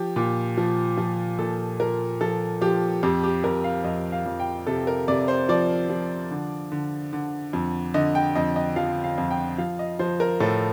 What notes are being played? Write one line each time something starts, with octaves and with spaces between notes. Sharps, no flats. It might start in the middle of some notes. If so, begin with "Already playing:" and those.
Already playing: F3 G4
A#2
F3
F3
A#2 A4
F3 A#4
F3 A4
F3 G4
F2 G4
G4
F2 A#4
F5
F2 D#5
F5
F2
G5
C3 A4
A#4
C3 D5
C5
F3 D5
F3
D3
D3
D3
F2
D3 D#5
G5
F2 D#5
D#5
F3 F5
F5
F2
G5
F3 F5
D#5
F3 C5
A#4
A2 A4